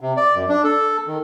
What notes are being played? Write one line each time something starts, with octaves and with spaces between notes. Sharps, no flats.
C3
D5
F#2
D4
A4
D#3